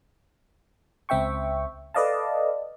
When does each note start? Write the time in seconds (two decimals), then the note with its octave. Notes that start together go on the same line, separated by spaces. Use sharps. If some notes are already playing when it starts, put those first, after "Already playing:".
1.09 C#2 C4 E5 G5 C#6
1.94 A4 B4 D5 D#5 F5 A5